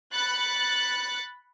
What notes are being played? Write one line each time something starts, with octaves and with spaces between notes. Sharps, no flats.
B5 F#6 A6 C#7